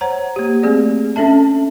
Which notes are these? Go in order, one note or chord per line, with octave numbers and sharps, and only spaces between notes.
C5 C#5 F#5 A#5
A#3 G4
A3 C4 G#4 D5
C#4 D4 A4 E5 A5